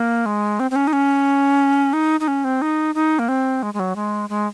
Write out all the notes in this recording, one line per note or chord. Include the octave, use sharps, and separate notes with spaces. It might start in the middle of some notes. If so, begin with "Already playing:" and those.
Already playing: A#3
G#3
C4
C4
C#4
D#4
C#4
D#4
D#4
C#4
C4
D#4
D#4
A#3
C4
G#3
G#3
F#3
G#3
G#3